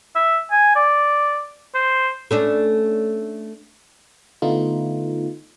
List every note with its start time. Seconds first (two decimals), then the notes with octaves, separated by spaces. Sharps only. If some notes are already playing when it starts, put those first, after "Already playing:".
0.16 E5
0.52 G#5
0.76 D5
1.75 C5
2.31 A3 C#4 D4
4.42 D3 A3 B3 D#4 F4